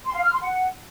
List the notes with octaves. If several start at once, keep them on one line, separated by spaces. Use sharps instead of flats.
C6
F5
F6
C6
F#5